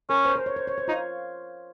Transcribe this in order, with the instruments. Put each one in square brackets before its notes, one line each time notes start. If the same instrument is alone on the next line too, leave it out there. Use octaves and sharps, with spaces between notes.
[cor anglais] C#4 [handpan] A#4
[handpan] C5
C5
C#5
C5
C#5
C5
[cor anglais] D#4 [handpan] F4